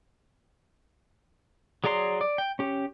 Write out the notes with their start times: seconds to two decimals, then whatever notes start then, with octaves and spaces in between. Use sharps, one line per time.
1.84 F#3 G#4 D5 A#5 C6
2.21 D5
2.38 G5
2.59 C#4 G4